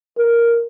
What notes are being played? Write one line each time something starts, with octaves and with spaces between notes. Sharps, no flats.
A#4